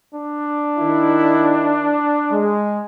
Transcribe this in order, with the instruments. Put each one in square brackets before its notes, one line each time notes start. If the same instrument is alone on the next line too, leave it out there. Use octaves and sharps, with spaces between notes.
[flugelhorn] D4
[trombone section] D#3 E4
G#3